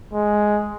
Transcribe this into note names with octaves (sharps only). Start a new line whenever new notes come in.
G#3